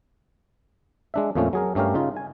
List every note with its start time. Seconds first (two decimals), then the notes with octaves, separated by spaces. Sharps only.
1.14 G#3 D4 E5
1.35 F2 A#2 F3 A3 C#4
1.53 F#3 G#4 A#4
1.75 G2 A3 C#4 G4 A#4 F5
1.94 C#3 D#4 F4
2.17 G#5